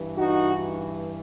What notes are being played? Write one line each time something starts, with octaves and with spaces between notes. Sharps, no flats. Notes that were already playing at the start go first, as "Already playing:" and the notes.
Already playing: G2 E3
D#4 F#4